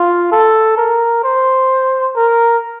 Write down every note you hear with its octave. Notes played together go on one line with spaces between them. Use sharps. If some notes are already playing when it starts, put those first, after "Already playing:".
Already playing: F4
A4
A#4
C5
A#4